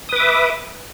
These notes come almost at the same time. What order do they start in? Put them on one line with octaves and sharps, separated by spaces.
D#6 B4 D6 E5